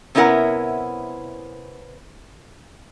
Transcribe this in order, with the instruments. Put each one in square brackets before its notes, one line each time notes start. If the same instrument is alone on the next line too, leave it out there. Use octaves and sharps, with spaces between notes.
[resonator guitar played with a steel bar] C3 B3 C#4 E4 A#4 F#5